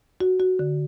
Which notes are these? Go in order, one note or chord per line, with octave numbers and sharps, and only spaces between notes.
F#4
F#4
D3